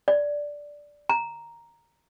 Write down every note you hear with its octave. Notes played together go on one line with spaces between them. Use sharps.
D5
A#5